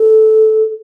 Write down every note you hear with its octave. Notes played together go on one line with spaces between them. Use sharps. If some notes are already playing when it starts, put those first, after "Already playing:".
Already playing: A4